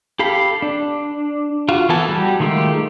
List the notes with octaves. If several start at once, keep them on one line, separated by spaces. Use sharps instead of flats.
G4 A4 F5 B5
D4
F4 F#4
E3 B3 A4 G#5 A5
G3 F#4 G4
D#3 G#3 A3 F4 G4